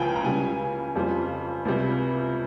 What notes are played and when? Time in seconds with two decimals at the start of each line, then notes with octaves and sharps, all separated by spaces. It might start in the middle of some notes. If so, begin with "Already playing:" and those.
Already playing: C#2 C#3 F3 G5 G#5
0.16 A#5
0.24 C#2 C#3 G3 G#5
0.95 F2 C#3 G3 C4 F4
1.65 C#2 C3 G3